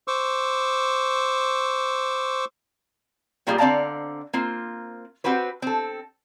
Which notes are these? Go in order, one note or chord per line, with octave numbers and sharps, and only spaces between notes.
C5 C#6 D6 E6
B2 G3 A#3 F4 G4 G#4
D3 C4 D5 F5 A5 A#5
A#3 C4 F4
C4 F#4 G4 B4 C5
C4 A4